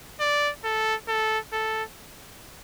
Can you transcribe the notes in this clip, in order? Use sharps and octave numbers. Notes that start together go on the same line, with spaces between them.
D5
A4
A4
A4